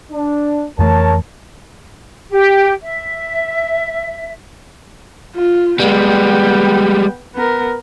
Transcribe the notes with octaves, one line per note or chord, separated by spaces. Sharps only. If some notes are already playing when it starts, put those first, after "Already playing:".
D4
F2 E3 A3 A#4 C#5 A5
G4
E5
F4
G3 G#3 B3 G5
B3 A#4